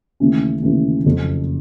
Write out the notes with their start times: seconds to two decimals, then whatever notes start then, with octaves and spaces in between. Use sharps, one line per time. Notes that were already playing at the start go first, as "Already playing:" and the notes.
0.20 D#2 C#3 E3 A3 C#4
0.63 D#2 C#3 E3 A3 C#4
1.05 F#1 F2 C#3